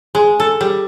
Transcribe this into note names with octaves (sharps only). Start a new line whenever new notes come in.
G#3
A4
G3